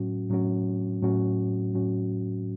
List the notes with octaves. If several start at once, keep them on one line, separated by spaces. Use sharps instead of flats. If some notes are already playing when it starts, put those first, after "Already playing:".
Already playing: A2 F#3 C#4 F#4
A2 F#3 C#4 F#4
A2 F#3 C#4 F#4
A2 F#3 C#4 F#4